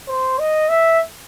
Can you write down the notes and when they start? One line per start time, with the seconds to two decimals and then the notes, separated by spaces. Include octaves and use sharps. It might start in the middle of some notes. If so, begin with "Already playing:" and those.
0.08 C5
0.39 D#5
0.69 E5